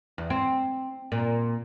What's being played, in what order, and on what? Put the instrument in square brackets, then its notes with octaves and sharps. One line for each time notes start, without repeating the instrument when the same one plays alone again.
[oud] E2
C4
A#2